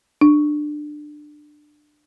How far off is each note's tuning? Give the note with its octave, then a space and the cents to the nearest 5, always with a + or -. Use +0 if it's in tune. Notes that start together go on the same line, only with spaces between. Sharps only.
D4 +20